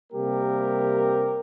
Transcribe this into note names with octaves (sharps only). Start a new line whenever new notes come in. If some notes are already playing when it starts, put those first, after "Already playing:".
C3 G3 A#3 G4 A#4